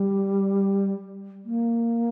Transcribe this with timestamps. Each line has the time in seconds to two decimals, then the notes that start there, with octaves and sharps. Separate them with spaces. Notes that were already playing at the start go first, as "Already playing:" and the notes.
Already playing: G3
1.45 A#3